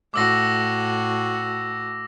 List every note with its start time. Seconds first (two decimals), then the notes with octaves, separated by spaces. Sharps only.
0.14 A2 F#4 D6 E6 A#6